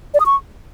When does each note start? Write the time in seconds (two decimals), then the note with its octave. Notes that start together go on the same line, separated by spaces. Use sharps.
0.14 D5
0.20 D#6
0.26 C#6